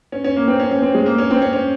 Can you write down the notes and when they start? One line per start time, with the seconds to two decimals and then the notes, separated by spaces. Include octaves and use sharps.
0.12 C#4
0.24 C#4
0.36 A#3
0.48 C4
0.60 C#4
0.71 C#4
0.82 C4
0.94 G#3
1.06 A#3
1.18 C#4
1.31 C4
1.42 C#4
1.53 C#4